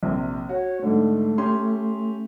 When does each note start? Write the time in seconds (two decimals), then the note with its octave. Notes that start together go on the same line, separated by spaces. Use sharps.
0.03 A#1 C3 C4
0.49 F#4 C#5
0.82 G#2 D3 A3
1.38 C#4 G4 C6